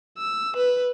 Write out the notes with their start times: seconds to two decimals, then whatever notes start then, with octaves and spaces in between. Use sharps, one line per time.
0.18 E6
0.57 B4